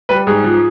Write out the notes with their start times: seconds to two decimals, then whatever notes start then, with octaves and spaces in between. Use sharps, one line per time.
0.09 G3 B4
0.27 G#2 G#4
0.44 F3